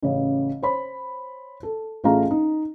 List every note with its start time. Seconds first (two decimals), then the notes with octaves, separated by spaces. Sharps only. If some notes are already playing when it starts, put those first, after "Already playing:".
0.02 A1 C#3
0.63 C5 C#5 B5
1.63 A4
2.04 A1 A3 F4 G#4 F5 A#5
2.31 D#4